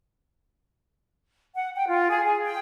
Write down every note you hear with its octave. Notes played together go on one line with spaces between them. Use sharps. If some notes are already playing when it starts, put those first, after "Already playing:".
F#5
G5
F4
G#4
G#4
G5